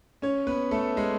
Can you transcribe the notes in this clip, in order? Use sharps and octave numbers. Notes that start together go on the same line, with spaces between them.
C#4 C#5
B3 B4
A3 A4
G#3 G#4